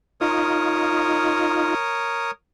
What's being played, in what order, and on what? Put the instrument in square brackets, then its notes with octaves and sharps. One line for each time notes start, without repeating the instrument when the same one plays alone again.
[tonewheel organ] D#4 F4 [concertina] A#4 C#5 D#6